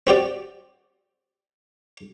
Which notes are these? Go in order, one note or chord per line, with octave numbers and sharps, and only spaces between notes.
C4 F#4 G4 D5